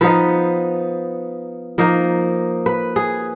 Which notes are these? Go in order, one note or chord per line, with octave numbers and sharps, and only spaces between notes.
F3 B3 D#4 B4
F3 A#3 D#4
B4
G#4